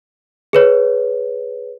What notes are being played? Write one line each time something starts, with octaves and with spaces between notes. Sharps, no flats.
G#4 B4 C#5